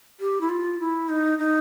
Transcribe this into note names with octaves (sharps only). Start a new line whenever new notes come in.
G4
E4
F4
E4
D#4
D#4